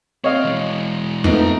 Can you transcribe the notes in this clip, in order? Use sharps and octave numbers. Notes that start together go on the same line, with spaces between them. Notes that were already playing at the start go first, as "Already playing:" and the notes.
C4 C#5 D#5 F5
E3 G#3
F2 A3 B3 D#4 B4 A#5